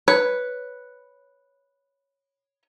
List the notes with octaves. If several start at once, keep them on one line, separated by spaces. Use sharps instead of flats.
B4 C#5